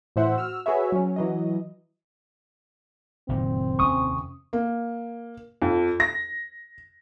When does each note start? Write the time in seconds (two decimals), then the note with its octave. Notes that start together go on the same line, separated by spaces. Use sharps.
0.16 A2 E3 C5 E5 F#5
0.36 F#4 E6 F6
0.66 F#4 G#4 B4 C#5 E5
0.92 F#3 C#4
1.16 E3 F#3 D#5
3.29 F#1 A#2 D#3 C4
3.79 F1 D#2 C#4 C#6 D#6
4.53 A#3
5.62 F2
6.00 A#6